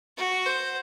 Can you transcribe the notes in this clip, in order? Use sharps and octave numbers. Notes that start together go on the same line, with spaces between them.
F#4
C5